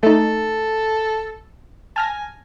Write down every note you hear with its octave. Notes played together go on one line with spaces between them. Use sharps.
A3 D#4 A4
G#5 A5 F6 A#6